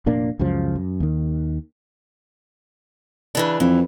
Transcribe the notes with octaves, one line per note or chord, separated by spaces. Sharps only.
F1 A#2 A#3 D4
C#2 F#2 C#3 F3
F#2
D#2 D#3
C#3 E3 D4
F2 E3